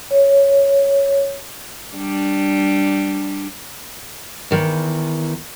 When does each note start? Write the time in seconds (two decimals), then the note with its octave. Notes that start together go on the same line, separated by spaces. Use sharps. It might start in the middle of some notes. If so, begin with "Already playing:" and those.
0.11 C#5
1.95 G3 D4
4.51 E2 D#3 E3